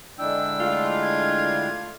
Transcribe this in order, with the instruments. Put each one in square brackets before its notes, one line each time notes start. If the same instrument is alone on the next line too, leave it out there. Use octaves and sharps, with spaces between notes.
[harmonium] D3 G#3 E4 [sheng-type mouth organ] D4 G5 [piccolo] E6
[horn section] A3 F4
[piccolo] G#6